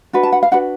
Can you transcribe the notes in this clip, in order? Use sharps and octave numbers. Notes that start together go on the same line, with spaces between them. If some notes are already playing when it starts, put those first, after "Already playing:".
D4 F#4 B4
A5
F#5
F5
D4 F#4 B4 F#5